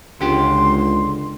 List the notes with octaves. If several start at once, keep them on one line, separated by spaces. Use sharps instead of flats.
C#2 D3 G4 C6